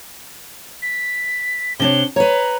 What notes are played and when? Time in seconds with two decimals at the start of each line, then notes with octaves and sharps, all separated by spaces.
0.82 B6
1.80 C3 D4 C#5 G7
2.16 B4 C#5 A#5